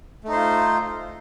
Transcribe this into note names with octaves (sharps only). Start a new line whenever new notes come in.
A3 D#4 F4 C5